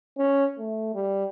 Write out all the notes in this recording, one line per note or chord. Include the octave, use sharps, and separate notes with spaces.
C#4
A3
G3